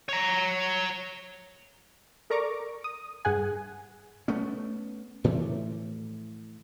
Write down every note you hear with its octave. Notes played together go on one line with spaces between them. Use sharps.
C#5 A#5
A4 A#4 D5 A#5 C#6 D6
D#6
G2 G#4 F#5 G#5
A3 B3 C#4
A2 E3 F3 A3